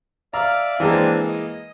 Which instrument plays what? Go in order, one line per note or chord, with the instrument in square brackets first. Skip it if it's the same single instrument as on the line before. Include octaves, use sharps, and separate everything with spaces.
[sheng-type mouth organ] D5 E5 F5 [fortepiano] A#5
[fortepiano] E3 G#3 A#3 [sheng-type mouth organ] C4 D4 G#5
[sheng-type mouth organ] D#5